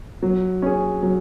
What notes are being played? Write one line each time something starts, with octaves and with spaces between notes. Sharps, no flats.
F#3
C#4 G#4
F#3